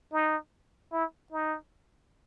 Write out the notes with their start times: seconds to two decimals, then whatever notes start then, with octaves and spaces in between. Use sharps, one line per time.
0.13 D#4
0.92 E4
1.32 D#4